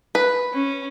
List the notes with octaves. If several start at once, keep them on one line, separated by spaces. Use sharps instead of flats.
B4
C#4